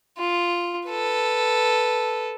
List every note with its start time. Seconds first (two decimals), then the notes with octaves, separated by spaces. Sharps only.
0.18 F4
0.88 A4 B4